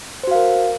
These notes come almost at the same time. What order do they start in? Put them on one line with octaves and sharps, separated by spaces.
C5 F#4 F5 A#4